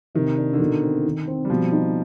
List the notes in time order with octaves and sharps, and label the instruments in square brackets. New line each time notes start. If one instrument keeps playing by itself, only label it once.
[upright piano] C3 [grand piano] D#3
[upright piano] D4
[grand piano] D3
[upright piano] B2 [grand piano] D#3
[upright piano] C4
D#3
C4
[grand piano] G3
[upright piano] B2 [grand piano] F3
[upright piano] D#4